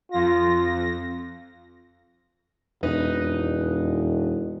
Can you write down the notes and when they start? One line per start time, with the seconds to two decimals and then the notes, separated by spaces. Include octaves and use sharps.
0.11 F2 F4 A#6
2.83 E1 F2 D#4 B4 D#5